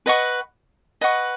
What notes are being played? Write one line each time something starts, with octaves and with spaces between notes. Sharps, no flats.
B4 D#5 F#5 C#6
B4 D#5 F#5 C#6